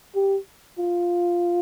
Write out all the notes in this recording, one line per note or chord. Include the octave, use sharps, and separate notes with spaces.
G4
F4